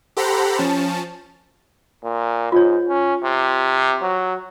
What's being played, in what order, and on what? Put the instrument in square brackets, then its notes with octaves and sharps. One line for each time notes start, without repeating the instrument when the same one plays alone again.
[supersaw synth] G4 A4 C5 F#5 A#5 B5
F3 C#4 A5
[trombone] A#2
[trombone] G#2 [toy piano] F4 C#5
[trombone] C#4
C3
F#3